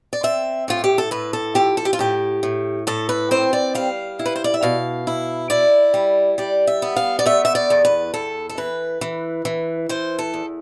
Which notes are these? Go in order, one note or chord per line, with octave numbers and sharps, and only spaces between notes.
D5
C4 E5
A2 F4
G4
A4
A2 B4
A4
F3 G4
A4
G4
F4
A2 G4
A2
A2 A4
B4
C4 C5
D5
G3 F5
E4
B4
C5
D5
E5
B2 F5
E4
E4 D5
G3
G3 D5
E5
B3
F5
D5
A3 E5
E5
D5
E2
B4
E2 A4
A4
E3 B4
E3
E3
E3 C5
A4
E2